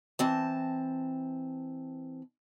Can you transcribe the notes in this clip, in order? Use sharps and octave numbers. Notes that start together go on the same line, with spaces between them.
E3 C4 A5